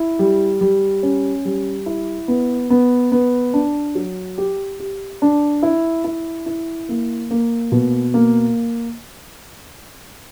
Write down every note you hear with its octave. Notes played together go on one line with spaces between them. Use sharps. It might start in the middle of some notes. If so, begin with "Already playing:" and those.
Already playing: E4
G3
G3
C#4
G3
E4
B3
B3
B3
D4
F#3
G4
G4
D4
E4
E4
E4
A#3
A#3
B2
A#3